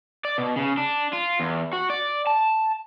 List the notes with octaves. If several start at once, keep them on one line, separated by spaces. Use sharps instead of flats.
D5
B2
C#3
D4
F4
E2
F#4
D5
A5